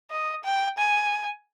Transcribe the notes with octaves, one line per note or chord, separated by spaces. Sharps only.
D#5
G5
G#5